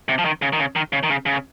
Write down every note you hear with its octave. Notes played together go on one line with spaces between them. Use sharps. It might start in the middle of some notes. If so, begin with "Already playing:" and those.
C3
F3
D#3
C#3
D#3
C#3
D#3
C#3
D#3
C#3
C#3